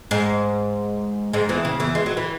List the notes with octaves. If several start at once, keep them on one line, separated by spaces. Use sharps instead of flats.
G#2 G#3
G#2 G#3
E2 E3
C#3
E2 E3
G#3
F#3
E3